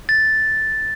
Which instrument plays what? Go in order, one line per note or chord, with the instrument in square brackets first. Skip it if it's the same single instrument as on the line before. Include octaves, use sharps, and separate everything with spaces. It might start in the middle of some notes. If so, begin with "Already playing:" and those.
[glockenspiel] A6